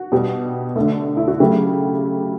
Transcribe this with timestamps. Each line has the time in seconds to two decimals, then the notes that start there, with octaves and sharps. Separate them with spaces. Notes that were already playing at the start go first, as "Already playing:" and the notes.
Already playing: F#4
0.12 B2 G3
0.76 D3 A3
1.17 E4
1.28 F#4
1.40 C#3 F#3 A3 G4